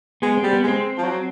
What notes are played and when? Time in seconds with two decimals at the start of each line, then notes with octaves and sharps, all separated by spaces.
0.22 G#3 B3
0.37 C4
0.43 G3
0.53 B3
0.63 G#3 C4
0.98 F3
1.04 F#3